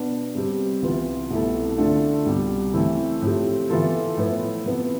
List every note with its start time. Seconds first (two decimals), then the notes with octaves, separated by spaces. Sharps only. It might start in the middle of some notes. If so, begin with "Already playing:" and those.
Already playing: B2 B3 D4
0.35 C3 G3 C4 G4
0.82 C2 C3 E3 B3 F4
1.30 C2 B2 A3 E4 A4
1.78 D3 A3 D4 F4 A4
2.25 C2 B2 G3
2.73 E3 A3 C4 E4 A4
3.22 A2 F3 C4 G4
3.70 E3 B3 F4 A4
4.17 A2 F3 B3 E4
4.66 C3 F3 B3